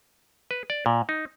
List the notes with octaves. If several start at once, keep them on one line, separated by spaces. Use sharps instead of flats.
B4
D5
A#2
D#4